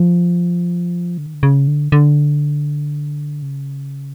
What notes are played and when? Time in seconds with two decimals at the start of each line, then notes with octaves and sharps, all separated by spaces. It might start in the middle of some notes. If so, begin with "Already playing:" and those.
Already playing: F3
1.18 D3
1.26 D#3
1.34 D3
1.43 C#3
1.68 D3
1.92 D3
3.43 C#3